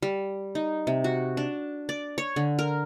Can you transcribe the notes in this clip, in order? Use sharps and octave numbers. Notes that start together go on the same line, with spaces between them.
G3
D#4
C3
F#4
D4
D5
C#5
D3
A#4